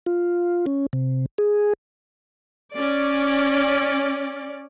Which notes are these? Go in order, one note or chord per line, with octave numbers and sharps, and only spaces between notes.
F4
C#4
C3
G#4
C#4 D5